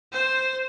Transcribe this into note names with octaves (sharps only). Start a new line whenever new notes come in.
C5